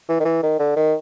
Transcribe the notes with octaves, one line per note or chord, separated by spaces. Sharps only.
E3
D#3
E3
D#3
D3
D#3